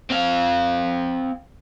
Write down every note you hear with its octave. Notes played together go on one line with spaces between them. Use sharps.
C4 F5